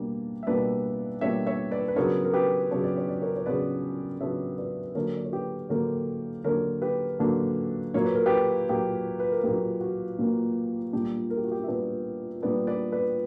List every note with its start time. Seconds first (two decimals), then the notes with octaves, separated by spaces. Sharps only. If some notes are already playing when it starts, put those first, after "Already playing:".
Already playing: B2 G3 A#3 D4
0.43 E5
0.47 B2 G3 A#3 D4 B4 D5
1.21 B2 G3 A#3 D4 C#5 E5
1.47 C#5 E5
1.71 B4 D5
1.88 B4
1.96 C#3 F#3 B3 D4 A#4 C#5
2.25 A#4
2.33 G4 B4
2.71 C#3 F#3 B3 D4 C#5
2.84 D5
2.96 C#5
3.09 D5
3.22 A#4 C#5
3.37 C#5
3.46 C#3 F#3 B3 D4 B4 D5
4.20 C#3 F#3 B3 D4 C#5 E5
4.58 B4 D5
4.95 D3 F#3 A#3 D4 A#4 C#5
5.17 D5
5.25 C#5
5.33 G4 B4
5.69 D3 F#3 A#3 D4 A#4 C#5
6.44 D3 F#3 A#3 D4 A#4 C#5
6.82 G4 B4
7.19 D3 F#3 A#3 D4
7.94 A#2 F#3 A#3 C#5
8.05 B4
8.15 A#4
8.26 G4 B4
8.69 A#2 F#3 A#3 G4
9.20 B4
9.32 A#4
9.43 A#2 F#3 A#3 G4
9.81 F#4
10.18 A#2 F#3 A#3
10.93 A#2 G3 B3 D4 G4
11.30 A#4
11.37 G4
11.44 F#4
11.52 G4
11.64 E5
11.67 A#2 G3 B3 D4 B4 D5
12.42 A#2 G3 B3 D4 B4 D5
12.67 B4 D5
12.92 B4 D5